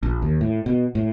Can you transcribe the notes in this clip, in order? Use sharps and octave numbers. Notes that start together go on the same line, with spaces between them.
A#1
D#2
A2
B2
A2